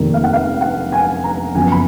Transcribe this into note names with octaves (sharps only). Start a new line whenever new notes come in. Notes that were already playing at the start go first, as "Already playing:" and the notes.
Already playing: F1 F2 D#3 A#3
F5
F#5
F5
F#5
G#5
A#5
F#1 F#2 F3 B3 G#5
B5